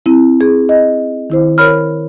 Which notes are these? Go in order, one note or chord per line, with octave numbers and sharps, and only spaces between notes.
C4 E4
G#4
D#5
D#3 E4 C5
A#4 C#5 B5 F6